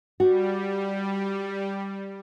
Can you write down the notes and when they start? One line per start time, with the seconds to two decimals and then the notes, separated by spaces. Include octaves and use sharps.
0.20 G3 F#4